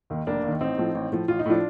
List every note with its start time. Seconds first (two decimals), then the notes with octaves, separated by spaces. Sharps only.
0.10 D#2 D#3
0.27 F1 A#3 D4
0.43 D#2 D#3
0.61 A1 C4 D#4
0.77 A2 F3
0.95 A1
1.12 A2 F3
1.28 A1 F4
1.39 D#4
1.46 A2 F3 D4 F4